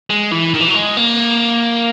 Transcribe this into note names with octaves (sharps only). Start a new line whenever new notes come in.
G#3
E3
D#3
E3
F#3
G#3
A#3